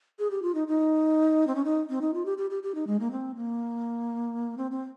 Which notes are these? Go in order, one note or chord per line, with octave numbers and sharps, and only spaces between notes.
G#4
G4
F4
D#4
D#4
C4
C#4
D#4
C4
D#4
F4
G4
G4
G4
G4
D#4
G#3
A#3
C4
A#3
C4
C4